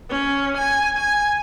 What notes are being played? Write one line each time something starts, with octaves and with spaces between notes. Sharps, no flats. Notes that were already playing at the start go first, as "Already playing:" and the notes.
C#4
G#5
G#5